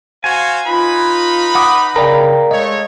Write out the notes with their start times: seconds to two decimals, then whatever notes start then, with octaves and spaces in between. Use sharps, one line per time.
0.24 F#4 C5 F5 G#5
0.66 D#4 F4 B4 B5
1.55 F#5 D6 D#6
1.96 C#3 A#4 D5 F5 G5 A#5
2.51 G#3 A3 C#5 D#5